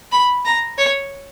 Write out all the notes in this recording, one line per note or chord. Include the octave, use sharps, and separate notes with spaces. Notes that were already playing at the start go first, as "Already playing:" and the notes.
B5
A#5
C#5